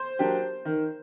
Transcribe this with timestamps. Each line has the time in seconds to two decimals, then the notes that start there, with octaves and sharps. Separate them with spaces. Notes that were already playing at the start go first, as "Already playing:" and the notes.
Already playing: C5
0.19 F#3 A#3 D4 G4
0.65 D#3